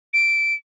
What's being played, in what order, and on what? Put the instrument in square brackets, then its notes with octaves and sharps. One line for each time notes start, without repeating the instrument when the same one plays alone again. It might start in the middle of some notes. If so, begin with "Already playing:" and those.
[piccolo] D7